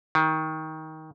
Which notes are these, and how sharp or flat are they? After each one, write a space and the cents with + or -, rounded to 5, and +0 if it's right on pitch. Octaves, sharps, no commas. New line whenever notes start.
D#3 +20